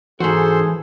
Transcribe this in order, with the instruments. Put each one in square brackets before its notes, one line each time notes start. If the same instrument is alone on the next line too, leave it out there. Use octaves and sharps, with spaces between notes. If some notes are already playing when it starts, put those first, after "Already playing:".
[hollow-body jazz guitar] G#2 F#4 [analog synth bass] E3 [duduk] G#4 [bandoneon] A4 C5 C6